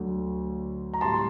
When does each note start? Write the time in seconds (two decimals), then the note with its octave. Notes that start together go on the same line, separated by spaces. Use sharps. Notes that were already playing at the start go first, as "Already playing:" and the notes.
Already playing: D2 D3 F#3
0.94 A#5
1.01 A2 G3 A5 C6
1.14 C6